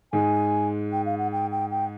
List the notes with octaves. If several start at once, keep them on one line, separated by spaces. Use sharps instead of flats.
G#2 G#3 G#5
G5
F5
F#5
G5
G5
G5